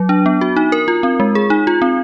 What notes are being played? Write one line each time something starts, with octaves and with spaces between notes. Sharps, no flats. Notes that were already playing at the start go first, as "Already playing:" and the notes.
Already playing: F#3
D4
B3
F#4
D#4
A#4
F4
C4
G#3
G#4
D#4
F4
C4